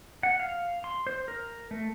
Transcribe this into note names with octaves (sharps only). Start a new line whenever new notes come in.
F#5
F5
C6
C5
A#4
A3